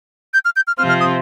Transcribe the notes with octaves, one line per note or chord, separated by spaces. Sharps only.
G6
F6
G6
F6
C3 F3 C4 F4 F6
F6
D#6